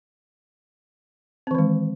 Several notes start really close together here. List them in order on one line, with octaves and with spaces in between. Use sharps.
C4 E3 D#3 G#3